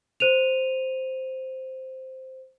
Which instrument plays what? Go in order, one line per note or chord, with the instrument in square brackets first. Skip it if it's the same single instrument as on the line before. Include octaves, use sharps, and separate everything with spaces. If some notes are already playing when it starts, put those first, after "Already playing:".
[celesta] C5 D#7 F7